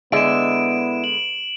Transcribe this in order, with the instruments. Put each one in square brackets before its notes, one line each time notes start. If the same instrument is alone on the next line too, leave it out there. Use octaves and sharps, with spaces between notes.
[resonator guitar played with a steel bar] D3 G#3 [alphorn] B3 [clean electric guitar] E4 D5 E5 [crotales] D7 E7
[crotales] F#7